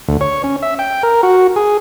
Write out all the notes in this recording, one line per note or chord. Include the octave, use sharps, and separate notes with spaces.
D2
C#5
C#4
E5
G5
A#4
F#4
G#4